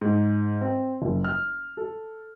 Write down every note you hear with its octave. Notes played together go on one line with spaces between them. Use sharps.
G#2
C4
F#1
F6
A4